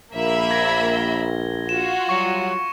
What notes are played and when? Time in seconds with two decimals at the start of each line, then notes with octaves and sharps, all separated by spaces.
0.14 A#1 A#3 E5 B5
0.51 G#6 A#6
0.95 G7
1.69 F4 F#4 E7
2.09 F#3 G3 C#6 C#7